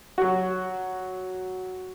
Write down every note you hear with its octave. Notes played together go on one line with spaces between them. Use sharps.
F#3 F#4